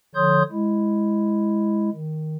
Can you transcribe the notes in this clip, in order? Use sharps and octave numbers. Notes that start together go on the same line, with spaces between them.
D3 F3 C#5 C6 D#6 G6
G#3 E4
D#3